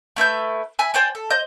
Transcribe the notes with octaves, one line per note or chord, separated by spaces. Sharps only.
A3 E4 B4 G6
E5 G#5 B5
C5 D5 G5 G#5
A4
C5 D#5 G6